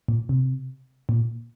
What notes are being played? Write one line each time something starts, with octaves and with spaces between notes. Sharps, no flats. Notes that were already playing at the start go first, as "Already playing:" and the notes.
A#2
C3
A#2